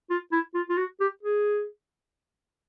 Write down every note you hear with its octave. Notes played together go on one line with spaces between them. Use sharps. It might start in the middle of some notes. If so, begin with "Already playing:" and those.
F4
E4
F4
F4
F#4
G4
G#4